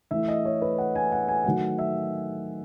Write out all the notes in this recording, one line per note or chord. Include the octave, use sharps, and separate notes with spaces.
E3 A3 E4 E5
D#5
C#5
B4
F#5
G#5
F#5
G#5
D#3 F#3 A3 F#5
E5